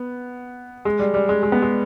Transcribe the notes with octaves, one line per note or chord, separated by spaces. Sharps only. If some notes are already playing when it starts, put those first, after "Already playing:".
Already playing: B3
G#3
G3
G3
G#3
G#3
B3
G#3